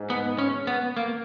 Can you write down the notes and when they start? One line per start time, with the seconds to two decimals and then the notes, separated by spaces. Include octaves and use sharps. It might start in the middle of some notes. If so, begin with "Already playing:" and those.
Already playing: G#2
0.10 B3
0.38 C#4
0.67 B3
0.97 A#3